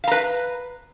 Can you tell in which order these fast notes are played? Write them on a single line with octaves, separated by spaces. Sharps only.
F5 A#5 B4